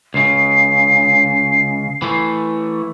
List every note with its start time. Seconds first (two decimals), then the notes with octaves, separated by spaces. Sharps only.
0.14 C#2 C#3 C7
2.02 E3 A3